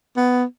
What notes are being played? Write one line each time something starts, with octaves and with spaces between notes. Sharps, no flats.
B3